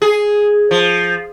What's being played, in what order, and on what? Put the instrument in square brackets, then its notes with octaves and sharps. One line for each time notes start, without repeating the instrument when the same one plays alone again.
[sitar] G#4
F3